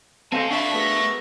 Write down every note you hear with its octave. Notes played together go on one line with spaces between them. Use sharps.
C4 A4 C5 D#5 F5 G#5 A5
D4 F#4 G#4 D5 E5 F5 A5 B5
A3 B3 G#4 A#4